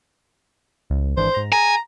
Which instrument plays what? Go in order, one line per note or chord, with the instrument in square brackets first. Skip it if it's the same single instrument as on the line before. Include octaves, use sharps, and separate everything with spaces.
[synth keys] C#2
[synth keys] G#1 E3 D4 [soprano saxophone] C5
[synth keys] G#2 A#5
[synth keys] G#4 [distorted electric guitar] G#5 [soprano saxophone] A#5